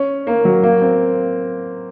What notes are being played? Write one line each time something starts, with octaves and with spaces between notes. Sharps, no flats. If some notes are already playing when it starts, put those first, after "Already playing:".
Already playing: C#4
A#3
F#3
A#3
C4